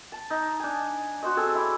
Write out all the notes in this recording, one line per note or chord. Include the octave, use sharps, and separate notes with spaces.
A5
D#4
D4 G#5
F#4 C5 D#5
C4 G#4 A4 G#5
E4 C#5 D5